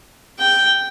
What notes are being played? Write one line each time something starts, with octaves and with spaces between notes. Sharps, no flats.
G5